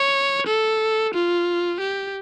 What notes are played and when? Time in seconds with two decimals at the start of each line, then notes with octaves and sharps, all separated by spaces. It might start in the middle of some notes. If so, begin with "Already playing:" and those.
Already playing: C#5
0.47 A4
1.14 F4
1.80 G4